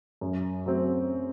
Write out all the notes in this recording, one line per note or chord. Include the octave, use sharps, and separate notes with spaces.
F#2
F#3 A3 C4